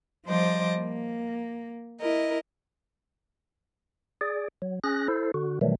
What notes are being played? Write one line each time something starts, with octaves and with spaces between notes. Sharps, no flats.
F3 G3 C5 D#5 D6
A#3
E4 A#4 D#5
G#4 D5
F#3
C#4 G#4 F#6 A#6
E4 A4 C5
D3 F#4
B2 D#3 E3 F#3 G3 A3